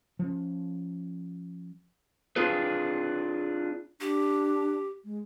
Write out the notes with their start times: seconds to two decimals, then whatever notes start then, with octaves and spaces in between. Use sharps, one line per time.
0.19 F3 C#4
2.36 C4 D4 F4 G#4 B4
4.01 D4 G4
5.05 G#3